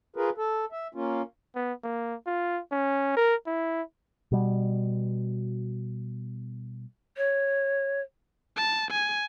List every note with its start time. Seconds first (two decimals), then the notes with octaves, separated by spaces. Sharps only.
0.16 F4 G#4 A#4 B4
0.38 A4
0.72 E5
0.95 A#3 C#4 F4
1.56 B3
1.84 A#3
2.27 F4
2.72 C#4
3.17 A#4
3.47 E4
4.32 B2 G3
7.17 C#5
8.56 A5
8.91 G#5